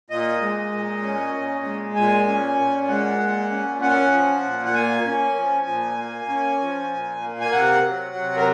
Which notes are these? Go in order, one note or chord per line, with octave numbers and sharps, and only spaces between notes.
A#2 D#5
G#3
A#2
C#4
A#2
G#3
A#2 G#5
C#4
A#2
G#3 F#5
A#2
C#4
C#4 F#5
F3
A#2
F#5
A#3 G#5
C#4
F3
A#2
A#3
C#4
F3
A#2
A#3
G#5
C3 F#5
F#3
C3
A#4